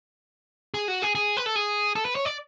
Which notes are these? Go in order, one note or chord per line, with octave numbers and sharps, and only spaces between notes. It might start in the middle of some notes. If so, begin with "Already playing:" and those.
G#4
F#4
G#4
G#4
B4
A4
G#4
A4
B4
C#5
D5